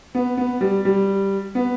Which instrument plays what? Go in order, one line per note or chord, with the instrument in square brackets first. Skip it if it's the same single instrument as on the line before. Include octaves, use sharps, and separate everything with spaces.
[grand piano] B3
B3
G3
G3
B3